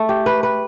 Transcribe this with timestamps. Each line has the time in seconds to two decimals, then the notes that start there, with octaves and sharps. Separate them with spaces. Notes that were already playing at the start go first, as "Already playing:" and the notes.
Already playing: A3
0.09 G4
0.26 B4
0.43 B4